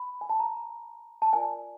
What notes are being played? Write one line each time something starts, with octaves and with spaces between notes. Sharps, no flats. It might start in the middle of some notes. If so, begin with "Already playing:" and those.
Already playing: B5
G#5
A5
A#5
A5
F4 A#4 D5 G#5